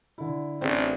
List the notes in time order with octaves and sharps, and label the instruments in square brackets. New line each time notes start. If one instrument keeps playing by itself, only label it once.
[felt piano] D3 E4
[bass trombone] A1 [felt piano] C4 D4 G#4